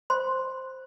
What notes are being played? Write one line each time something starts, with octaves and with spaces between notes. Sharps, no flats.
C5 C6